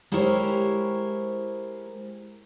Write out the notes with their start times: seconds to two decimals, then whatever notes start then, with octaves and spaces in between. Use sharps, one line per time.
0.12 G#3 E4 G4 A#4 C5 C#5